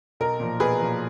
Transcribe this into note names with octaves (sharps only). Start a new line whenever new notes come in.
B1 A#4
A#2 F3
B1 G#4 B4
A#2 F3